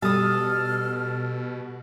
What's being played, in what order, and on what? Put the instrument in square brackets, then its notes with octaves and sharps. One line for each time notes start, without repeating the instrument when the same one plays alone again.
[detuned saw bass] B2 [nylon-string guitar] G3 [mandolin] A4 D#6 [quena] F6